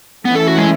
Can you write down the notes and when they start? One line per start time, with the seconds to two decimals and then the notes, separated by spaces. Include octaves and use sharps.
0.25 E3 A3 B3 C#4 E4
0.35 A4
0.48 F#4
0.58 G#3